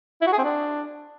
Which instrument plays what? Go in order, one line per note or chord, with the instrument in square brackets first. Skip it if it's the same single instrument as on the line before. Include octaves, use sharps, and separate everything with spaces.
[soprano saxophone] E4
F#4
G#4
C4
D4